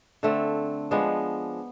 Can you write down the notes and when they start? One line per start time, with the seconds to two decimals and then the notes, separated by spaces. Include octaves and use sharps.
0.23 D3 A3 C4
0.91 F3 G#3 B3 D4